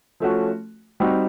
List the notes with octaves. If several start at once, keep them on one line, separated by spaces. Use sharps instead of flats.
F3 A3 C#4 F#4
G3 C4 D#4 F#4